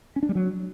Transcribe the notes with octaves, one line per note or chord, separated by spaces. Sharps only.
C#4
D4
G3
F#3